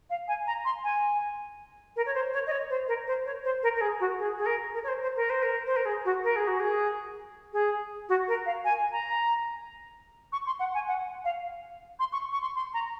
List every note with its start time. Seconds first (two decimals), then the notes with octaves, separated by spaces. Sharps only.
0.10 F5
0.28 G#5
0.47 A#5
0.65 C6
0.84 G#5
1.96 A#4
2.06 C#5
2.14 C5
2.33 C#5
2.47 D#5
2.51 C#5
2.70 C5
2.88 A#4
3.07 C5
3.26 C#5
3.44 C5
3.63 A#4
3.75 A#4
3.81 G#4
4.00 F#4
4.19 G#4
4.38 G#4
4.46 A#4
4.74 A#4
4.84 C#5
4.88 C5
5.02 C5
5.16 A#4
5.30 C5
5.43 A#4
5.66 C5
5.76 A#4
5.85 G#4
6.05 F#4
6.24 A#4
6.36 G#4
6.47 F#4
6.60 G#4
7.53 G#4
8.09 F#4
8.28 A#4
8.46 F5
8.64 G#5
8.92 A#5
10.32 C#6
10.46 C6
10.59 F#5
10.74 G#5
10.88 F#5
11.24 F5
11.99 C6
12.12 C#6
12.32 C#6
12.41 C6
12.55 C6
12.73 A#5